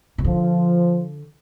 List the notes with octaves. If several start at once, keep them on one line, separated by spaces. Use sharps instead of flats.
C#3
D3 F3